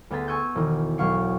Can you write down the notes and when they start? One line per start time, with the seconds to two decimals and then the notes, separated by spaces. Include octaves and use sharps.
0.10 D2 B3 G#4 C6 A6 B6
0.28 G#5 C#6 E6 G6
0.55 E1 D#3
0.98 E1 B1 F#3 F5 C#6 C7